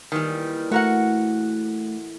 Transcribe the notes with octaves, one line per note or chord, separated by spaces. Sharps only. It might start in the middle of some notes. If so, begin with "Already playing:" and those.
A#2 D#3 E3 G3 G#4
A2 A3 F#4 A#4 F#5